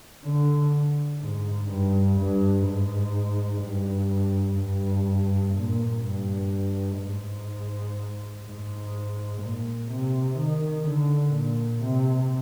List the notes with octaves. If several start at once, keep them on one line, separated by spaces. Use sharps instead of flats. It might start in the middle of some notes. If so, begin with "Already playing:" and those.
D3
G#2
G2
G2
G#2
G2
G2
A#2
G2
G#2
G#2
A#2
C3
D#3
D3
A#2
C3